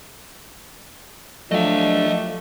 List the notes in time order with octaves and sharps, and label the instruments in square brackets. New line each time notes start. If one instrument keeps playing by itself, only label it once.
[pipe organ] F3 D4 [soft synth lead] F#3 [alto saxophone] A3 [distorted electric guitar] D#5 F5